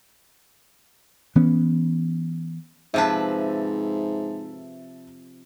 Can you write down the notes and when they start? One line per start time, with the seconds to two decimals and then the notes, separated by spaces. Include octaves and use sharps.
1.35 E3 B3 C#4
2.94 G#2 C3 F3 B4 E5 A5